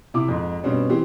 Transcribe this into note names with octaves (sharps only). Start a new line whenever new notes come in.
C3 E4 D6
F2 G#2
G2 B2 G3 C4 C#4
E3 C4 G4